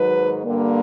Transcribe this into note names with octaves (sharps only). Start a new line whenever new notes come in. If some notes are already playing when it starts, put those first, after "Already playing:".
Already playing: G#2 D#3 F#3 B4
G2 D3 G3 A#3